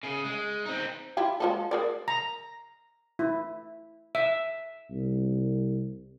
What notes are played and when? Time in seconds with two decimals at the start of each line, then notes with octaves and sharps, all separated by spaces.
0.03 C#3 G#4
0.24 G#3
0.65 C4 D#4
1.17 E4 F4 G4
1.40 G#3 F4 A4
1.71 G#4 A#4 D5
2.08 A#5
3.19 E4
4.15 E5
4.90 C2